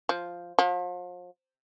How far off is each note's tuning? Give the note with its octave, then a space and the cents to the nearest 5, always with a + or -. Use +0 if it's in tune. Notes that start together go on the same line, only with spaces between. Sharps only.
F3 +0
F3 +40